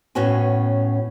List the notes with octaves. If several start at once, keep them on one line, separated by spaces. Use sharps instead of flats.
A2 B3 C#4 F#4 G#5